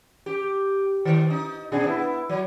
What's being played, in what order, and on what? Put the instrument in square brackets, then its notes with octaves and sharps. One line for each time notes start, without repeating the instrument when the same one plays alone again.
[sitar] G4
D#3
D#4
B2 D4 G#4
B3 E4
F#3